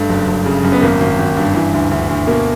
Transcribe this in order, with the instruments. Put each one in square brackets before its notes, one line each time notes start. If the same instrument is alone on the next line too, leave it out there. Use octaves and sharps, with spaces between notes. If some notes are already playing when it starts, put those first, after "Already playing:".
Already playing: [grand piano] G2 A3
F#1
F#1
C#3
F#2
B3
G#1 A#3
G#1
G#1
G2
E3
D2
D2
D2
B2 A#3